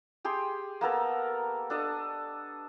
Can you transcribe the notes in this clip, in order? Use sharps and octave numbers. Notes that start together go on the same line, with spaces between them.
G4 G#4 G5 C6
A#3 B3 A4 A#4
D4 A4 D#5